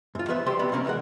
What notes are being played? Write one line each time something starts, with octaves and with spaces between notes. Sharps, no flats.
F#2 F4
F3 B3 B4 C5 E5
F#2 F#3 G3 G4 C5 C6
D2 C3 F#3 B3 B5
C3 A#3 C4 C#4 A#4
D2 E3 G#3 A#4 F#5